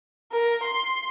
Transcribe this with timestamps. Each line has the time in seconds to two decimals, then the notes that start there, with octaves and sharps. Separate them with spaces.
0.32 A#4
0.63 C6